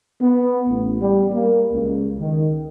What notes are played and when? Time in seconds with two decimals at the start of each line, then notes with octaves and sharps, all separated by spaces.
0.20 B3
0.69 A1
1.01 G3
1.32 A#3
1.73 C#2
2.20 D#3